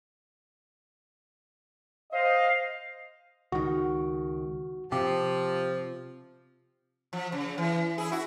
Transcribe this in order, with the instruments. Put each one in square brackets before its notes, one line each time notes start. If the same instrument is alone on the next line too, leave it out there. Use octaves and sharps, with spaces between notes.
[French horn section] C5 D#5 [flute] F5
[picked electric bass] C#2 D#3 [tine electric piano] F#4
[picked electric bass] C3 [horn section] F3 [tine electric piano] G4
[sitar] F3
C#3
E3
E4 G#4
E4 F#4